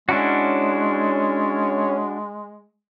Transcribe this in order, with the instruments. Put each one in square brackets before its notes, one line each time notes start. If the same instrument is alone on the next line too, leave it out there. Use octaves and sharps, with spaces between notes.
[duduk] G#3 [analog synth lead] C#4 [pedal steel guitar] D4 E4 F#4